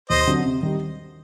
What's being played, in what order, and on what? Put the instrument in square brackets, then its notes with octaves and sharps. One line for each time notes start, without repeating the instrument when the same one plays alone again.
[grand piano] D#2 [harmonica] C5 D#5
[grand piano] D3 F#3 C4
C3
D#3 G3